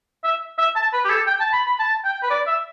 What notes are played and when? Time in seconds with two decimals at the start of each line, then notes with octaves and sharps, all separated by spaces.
0.24 E5
0.58 E5
0.76 A5
0.93 B4
1.04 G4
1.10 A4
1.27 G5
1.40 A5
1.53 B5
1.66 B5
1.79 A5
2.05 G5
2.22 B4
2.30 D5
2.47 E5